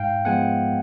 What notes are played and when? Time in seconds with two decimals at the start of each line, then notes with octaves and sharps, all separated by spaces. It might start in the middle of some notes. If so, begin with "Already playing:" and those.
Already playing: G#2 F5 G5
0.25 F3 G#3 B3 F#5 G#5